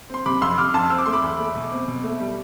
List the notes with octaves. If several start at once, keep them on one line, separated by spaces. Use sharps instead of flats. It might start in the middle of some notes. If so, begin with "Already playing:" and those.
C4 C6
C3 B5 D6
F2 C6 E6
C3 D6 F6
F2 A5 C6
C4 E6
D6
A3 C6
B5 D6
E2
A3
B2
C4
B2
A3
G3